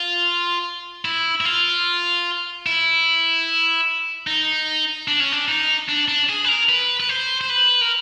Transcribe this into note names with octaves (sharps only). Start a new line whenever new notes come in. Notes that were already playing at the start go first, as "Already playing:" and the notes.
Already playing: F4
E4
E4
F4
E4
D#4
D4
C#4
D4
D#4
D4
D4
G#4
B4
A#4
B4
B4
C5
C5
B4
A#4